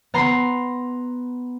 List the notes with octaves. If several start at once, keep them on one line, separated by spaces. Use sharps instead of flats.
B3 A#5 C6